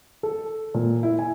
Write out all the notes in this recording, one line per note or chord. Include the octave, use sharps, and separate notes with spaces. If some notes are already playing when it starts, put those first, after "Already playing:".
A4
A#2
E4
G#5